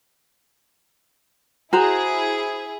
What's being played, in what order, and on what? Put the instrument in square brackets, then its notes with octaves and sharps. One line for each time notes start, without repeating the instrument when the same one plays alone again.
[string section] E4 G#4 [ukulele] F#4 C5 A#5